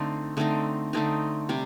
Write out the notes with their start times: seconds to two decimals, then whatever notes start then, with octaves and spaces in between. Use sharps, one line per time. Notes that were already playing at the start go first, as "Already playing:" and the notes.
Already playing: D3 A3 C4 D#4
0.37 D3 A3 C4 D#4
0.93 D3 A3 C4 D#4
1.49 C3 G3 C4